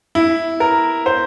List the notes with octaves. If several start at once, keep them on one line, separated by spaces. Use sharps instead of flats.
E4
A#4
C5